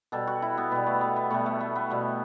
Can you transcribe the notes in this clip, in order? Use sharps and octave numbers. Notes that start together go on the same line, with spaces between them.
B2 G3 A4
F#4
E4
B3
B2 G3 B3
A3
B3
B3
B2 G3 A3
A3
B3
B3
B2 G3